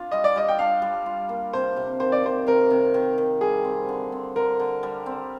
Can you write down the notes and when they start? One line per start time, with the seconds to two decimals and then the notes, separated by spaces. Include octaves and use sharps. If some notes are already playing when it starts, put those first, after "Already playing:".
Already playing: D4 F4
0.12 G3 D#5
0.24 D5
0.36 G3 D#5
0.48 G5
0.59 D4 F5
0.82 G3
1.06 F4
1.29 A#3
1.53 C3 C5
1.76 C3
2.00 D#3 C5
2.12 D5
2.23 C3 C5
2.47 C3 A#4
2.70 C3
2.94 D#3
3.18 D#3
3.41 G3 G#4
3.65 C4
3.89 D3
4.12 C4
4.36 D3 A#4
4.60 D3
4.83 G3
5.06 C4